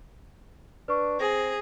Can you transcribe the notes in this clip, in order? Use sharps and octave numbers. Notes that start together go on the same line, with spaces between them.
D4 B4 C#6
C4 G#4 A#6